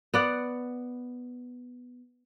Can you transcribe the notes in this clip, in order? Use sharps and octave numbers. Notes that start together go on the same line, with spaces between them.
B3 D5 F#5